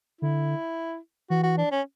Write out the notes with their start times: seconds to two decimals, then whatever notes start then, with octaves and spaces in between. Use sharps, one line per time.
0.21 D3 E4
1.30 E3 F#4
1.43 F#4
1.57 D4
1.72 C#4